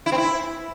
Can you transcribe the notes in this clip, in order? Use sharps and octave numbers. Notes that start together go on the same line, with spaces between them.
E4
C4
E4